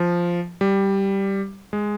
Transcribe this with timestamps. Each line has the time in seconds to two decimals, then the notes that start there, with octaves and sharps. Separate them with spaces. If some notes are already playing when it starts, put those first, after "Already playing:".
Already playing: F3
0.61 G3
1.73 G#3